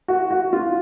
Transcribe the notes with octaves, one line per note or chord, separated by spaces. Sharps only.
F#4
F#4
F4